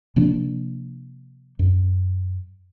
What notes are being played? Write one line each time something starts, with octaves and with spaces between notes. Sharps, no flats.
C3 F3 A#3 D4
F#2